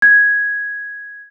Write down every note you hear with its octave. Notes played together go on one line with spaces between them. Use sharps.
G#6